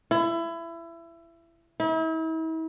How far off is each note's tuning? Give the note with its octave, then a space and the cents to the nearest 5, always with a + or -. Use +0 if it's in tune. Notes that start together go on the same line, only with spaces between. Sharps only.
E4 +25
E4 -40